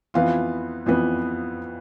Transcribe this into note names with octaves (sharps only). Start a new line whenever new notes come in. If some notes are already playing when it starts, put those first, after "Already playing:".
F2 E3 B3 F4 F5
F2 E3 B3